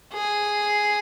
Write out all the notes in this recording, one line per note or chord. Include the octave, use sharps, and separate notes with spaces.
G#4